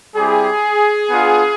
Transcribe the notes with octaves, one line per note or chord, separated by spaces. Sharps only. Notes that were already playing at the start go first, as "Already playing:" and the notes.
G3 C4 E4 G4 G#4
B3 D4 F4